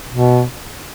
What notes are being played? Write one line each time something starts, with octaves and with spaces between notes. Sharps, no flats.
B2